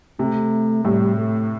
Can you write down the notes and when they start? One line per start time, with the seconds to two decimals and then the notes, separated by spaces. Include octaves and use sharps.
0.19 C3 A3
0.85 A2 G3
1.17 A3